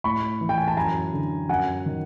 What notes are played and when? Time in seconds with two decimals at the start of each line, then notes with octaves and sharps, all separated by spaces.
0.04 A2 B5 C#6
0.41 E3
0.49 G5
0.58 G#5
0.68 A5
0.77 F#2 G#5 A#5
1.13 D3
1.49 F#2 F#5 G#5
1.86 D#3